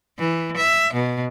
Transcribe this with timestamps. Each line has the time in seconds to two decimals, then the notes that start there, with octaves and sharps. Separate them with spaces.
0.18 E3
0.57 E5
0.93 B2